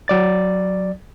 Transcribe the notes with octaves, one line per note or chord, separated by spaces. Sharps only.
F#3 D5 A6